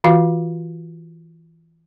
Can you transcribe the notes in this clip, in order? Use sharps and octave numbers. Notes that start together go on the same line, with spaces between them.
E3 F4 F#4 F5